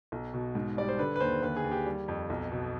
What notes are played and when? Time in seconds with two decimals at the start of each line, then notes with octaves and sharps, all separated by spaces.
0.12 B1
0.34 B2
0.55 G#2
0.77 G3 D5
0.88 C5
0.98 D3 B4
1.16 B4
1.20 D#2 C5
1.42 D#2 B4
1.57 G#4
1.64 D#2
1.72 G4
1.86 G3
2.08 F2
2.30 B1
2.52 B2